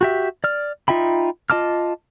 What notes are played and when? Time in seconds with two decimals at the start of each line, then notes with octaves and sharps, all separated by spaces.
0.01 F#4 G4 E5
0.44 D5 F6
0.88 D#4 F4 E5 G5 B5
1.50 F4 D#5 A5 D6 F6